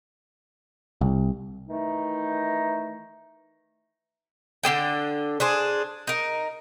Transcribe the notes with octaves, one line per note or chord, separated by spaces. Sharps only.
C2
D#3 E3 A3 D#4
D3 D4 G#4 G5
D4 G#4 C5
D#4 A#4